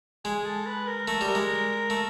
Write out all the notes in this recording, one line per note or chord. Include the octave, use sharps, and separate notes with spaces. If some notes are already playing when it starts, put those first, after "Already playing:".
G#3 G#4
A4
B4
A#4
A3 A#4
G3
A#4
G#3
A3